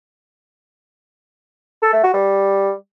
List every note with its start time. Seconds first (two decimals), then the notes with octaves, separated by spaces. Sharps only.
1.82 A4
1.93 A3
2.03 F#4
2.14 G3